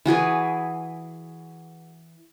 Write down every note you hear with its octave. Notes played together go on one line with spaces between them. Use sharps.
E3 F#4 G#4 B4